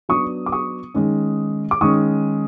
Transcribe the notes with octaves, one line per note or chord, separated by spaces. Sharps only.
F#3 B3 D4 C#6 D#6
D6
C#6 D#6
D#3 G#3 C#4
D6
D#3 G#3 C#4 C#6 D#6